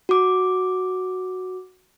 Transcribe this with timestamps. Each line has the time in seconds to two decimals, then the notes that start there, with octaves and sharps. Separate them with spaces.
0.09 F#4 D6